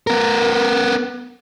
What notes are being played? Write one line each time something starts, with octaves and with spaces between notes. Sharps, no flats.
B3 A#4